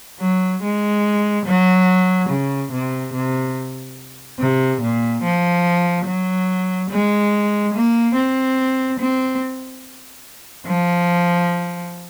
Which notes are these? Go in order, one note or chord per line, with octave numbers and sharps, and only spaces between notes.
F#3
G#3
F#3
C#3
C3
C3
C3
A#2
F3
F#3
G#3
A#3
C4
C4
F3